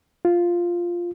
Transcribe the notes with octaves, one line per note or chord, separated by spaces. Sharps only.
F4